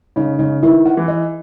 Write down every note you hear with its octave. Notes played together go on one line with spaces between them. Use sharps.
C#3 D#4
C#3 D#4
D#3 E4
F#5
E3
D#5